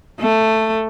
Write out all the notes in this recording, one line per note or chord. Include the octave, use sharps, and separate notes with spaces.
A3